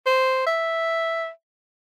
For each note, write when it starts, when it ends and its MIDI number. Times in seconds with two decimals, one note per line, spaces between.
0.06 0.44 72
0.47 1.29 76